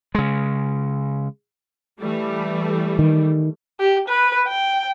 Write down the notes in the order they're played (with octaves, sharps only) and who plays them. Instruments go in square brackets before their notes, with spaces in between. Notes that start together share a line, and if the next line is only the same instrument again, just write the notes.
[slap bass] C#3 G#3
[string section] E3 G3 A3
[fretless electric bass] D#3
[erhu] G4
B4
G5